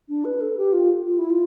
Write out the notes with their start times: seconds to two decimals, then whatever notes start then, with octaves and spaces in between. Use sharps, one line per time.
0.09 D4
0.25 B4
0.41 A4
0.57 G4
0.73 F4
1.05 F4
1.18 E4
1.30 F4